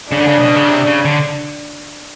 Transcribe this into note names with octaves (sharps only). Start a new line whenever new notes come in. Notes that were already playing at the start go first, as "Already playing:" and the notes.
C#3 D4
D3
C#3
B2
C#3
C3
C#3
D3